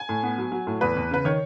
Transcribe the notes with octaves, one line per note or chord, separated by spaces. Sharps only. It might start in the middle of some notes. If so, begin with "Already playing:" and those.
Already playing: G#5
A2
B3
F#3
F#3
A2
E2 B4
E2
C#3 B4
D#3 C#5